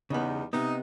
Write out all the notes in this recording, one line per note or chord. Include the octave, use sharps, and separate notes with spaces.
E2 C#3 G3 B3 D#4
C3 B3 D#4